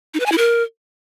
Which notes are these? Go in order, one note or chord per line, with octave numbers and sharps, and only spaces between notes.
D#4
B4
G#5
E4
A#4